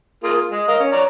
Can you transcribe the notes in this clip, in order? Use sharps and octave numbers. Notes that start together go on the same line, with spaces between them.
A#3 F4 G#4
F4
G#3 G#4
A#4 D#5 F5
C#4
C#5 D5 A#5